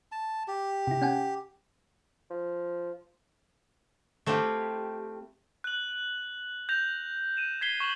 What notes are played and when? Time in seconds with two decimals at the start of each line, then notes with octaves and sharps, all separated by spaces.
0.12 A5
0.48 G4
0.87 C3 E4
1.02 C#4 F#5 G#5
2.30 F3
4.26 A3 C4 E4 F4 G4
5.64 F#6 F#7
6.69 G6 A#6 F7
7.37 D#7 E7
7.61 G#6 B6 C7 G7
7.80 C#6 E7 F#7